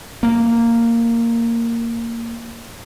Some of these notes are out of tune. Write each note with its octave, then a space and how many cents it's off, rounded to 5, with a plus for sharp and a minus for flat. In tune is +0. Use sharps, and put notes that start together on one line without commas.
A#3 -10